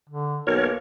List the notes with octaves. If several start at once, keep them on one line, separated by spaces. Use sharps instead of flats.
D3
B1 A#3 A#4 C#5